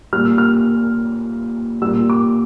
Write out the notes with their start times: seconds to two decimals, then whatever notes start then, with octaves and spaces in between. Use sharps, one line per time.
0.13 A#2 G3 F6
0.25 E6
0.38 F6
1.82 A#2 G3 E6
2.10 D6